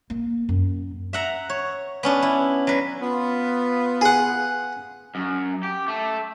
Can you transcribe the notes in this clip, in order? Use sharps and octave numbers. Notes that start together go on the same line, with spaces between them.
A#3
F#2
E5 F#5 A#5
C#5
B3 C#4 D4
E4
F#3 B4
B3 F4
G#4 F#5
F#2
G4
A3